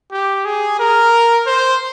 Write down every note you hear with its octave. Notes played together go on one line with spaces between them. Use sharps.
G4
G#4
A#4
C5